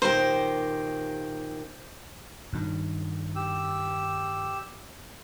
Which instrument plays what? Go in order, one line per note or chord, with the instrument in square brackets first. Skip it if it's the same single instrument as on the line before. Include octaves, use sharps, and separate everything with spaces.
[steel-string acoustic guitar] A#2 D#3 G4 [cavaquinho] C5
[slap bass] G2 D#3
[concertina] G4 E6